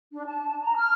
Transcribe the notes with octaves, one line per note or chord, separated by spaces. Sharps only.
D4
A5
A#5
F6